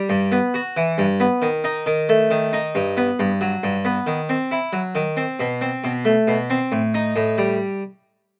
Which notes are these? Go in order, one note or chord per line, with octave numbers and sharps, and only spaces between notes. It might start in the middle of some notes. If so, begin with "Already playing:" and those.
Already playing: G3
G2
B3
F#4
E3
G2
B3
D#3
D#4
D#3
A3
D#3
D#4
G2
B3
G2
F#3
G2
B3
D#3
C4
E4
F#3
D#3
C4
B2
C4
B2
A3
B2
C4
A2
D#4
A2
G3